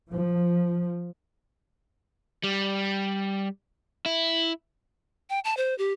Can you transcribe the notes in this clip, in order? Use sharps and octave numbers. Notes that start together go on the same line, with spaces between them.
F3
G3
E4
G5
A5
C5
G4